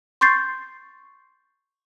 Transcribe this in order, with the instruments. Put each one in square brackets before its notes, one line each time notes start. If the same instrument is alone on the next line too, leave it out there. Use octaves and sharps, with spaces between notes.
[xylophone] C6 C#6 G6 A6 C7